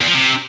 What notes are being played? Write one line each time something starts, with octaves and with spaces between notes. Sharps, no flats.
E2
F3
C3